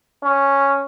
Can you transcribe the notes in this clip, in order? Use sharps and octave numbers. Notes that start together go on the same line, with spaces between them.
C#4